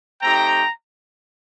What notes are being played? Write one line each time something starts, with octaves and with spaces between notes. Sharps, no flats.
A3 C4 D#4 G4 G5 A#5